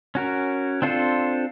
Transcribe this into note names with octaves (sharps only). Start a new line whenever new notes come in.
C#4 F#4 A#4
C4 D4 F4 A4 C5